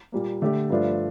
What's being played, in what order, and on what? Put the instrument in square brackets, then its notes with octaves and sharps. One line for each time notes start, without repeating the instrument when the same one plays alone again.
[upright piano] A#2 G3 A#3
D3 A3 D4 G4 D5
G2 F3 A3 D4 F4